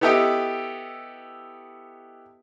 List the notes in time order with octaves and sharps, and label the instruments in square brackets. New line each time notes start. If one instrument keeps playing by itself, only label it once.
[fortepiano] B3 E4 G4 A4 D#5 G5